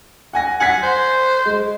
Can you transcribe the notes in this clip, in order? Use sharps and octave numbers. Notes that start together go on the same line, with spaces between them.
F#5 G#5 A#6
F#5 G#5 G#6 B6
C5
G#3